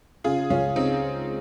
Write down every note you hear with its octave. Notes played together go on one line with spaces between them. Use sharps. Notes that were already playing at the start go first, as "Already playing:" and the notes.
C#3 F4 G#4
C#2 C#4 F4
C#3 C4 D#4